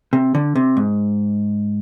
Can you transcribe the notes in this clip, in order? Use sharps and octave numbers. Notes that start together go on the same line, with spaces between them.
C3
D3
C3
G#2